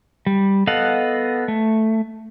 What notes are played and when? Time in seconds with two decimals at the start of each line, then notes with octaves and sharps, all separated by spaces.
0.26 G3
0.67 B3 A4 D#5 F5 F#5
1.48 A3